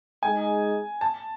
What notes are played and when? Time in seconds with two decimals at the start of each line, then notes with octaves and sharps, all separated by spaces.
0.23 G#3 D#4 G#4 G#5
1.01 A5